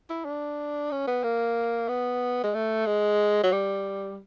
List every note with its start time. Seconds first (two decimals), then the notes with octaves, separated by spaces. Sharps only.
0.10 E4
0.25 D4
0.91 C#4
1.07 B3
1.24 A#3
1.89 B3
2.44 G#3
2.55 A3
2.86 G#3
3.44 F#3
3.52 G3